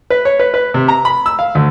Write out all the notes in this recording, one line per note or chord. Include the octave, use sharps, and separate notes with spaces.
B4
C#5
B4
B4
C3
A#5
B5
E6
F5
D2